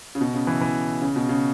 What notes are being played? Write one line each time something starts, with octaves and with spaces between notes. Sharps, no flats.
C#3
B2
C#3
E3
E3
C#3
B2
C#3